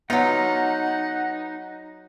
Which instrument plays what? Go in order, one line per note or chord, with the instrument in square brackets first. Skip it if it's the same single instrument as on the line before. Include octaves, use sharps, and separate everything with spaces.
[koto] F#3 F4 [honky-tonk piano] B3 [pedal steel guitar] D#4 [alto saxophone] F#5